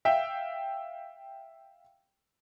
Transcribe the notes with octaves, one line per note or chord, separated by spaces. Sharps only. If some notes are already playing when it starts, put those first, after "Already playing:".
E5 F5 G5